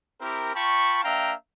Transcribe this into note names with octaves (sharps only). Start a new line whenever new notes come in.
C4 E4 G4 A#4
F4 G5 A5 B5 C#6
A#3 D4 E5 F5 G5 A#5